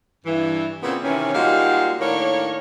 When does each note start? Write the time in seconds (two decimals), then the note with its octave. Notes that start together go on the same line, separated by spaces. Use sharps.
0.25 G2 E3
0.82 A#2 C#3 B3 C4
1.03 C3 D#3 E3 C#4
1.33 A#2 G3 G#3 D#4 F#4 F5
2.00 A2 D#3 A#3 D4 C#5